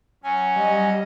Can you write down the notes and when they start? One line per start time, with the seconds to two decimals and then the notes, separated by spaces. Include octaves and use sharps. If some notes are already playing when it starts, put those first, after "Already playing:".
0.23 F#3 C#4 G#5
0.56 G3 D#5